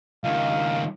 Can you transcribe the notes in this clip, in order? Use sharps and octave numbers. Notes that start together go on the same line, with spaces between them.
C#2 D#3 F5